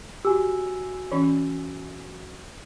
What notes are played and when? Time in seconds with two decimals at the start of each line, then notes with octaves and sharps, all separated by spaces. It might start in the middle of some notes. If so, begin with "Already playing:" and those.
0.25 F#4 G4 G#5 E6
1.12 E3 C#4 C#5